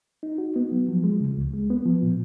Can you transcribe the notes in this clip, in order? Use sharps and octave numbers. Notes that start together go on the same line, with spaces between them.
D#4
F#4
B3
F#3
F3
G#3
C#3
C#2
G#3
B3
F3
A#2